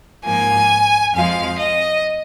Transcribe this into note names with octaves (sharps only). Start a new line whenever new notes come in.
G#2 F3 A#3 G#5
F2 F3 G#3 F5
D#5